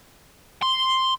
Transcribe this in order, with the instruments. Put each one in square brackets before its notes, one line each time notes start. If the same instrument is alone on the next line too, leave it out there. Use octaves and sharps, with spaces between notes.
[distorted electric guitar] C6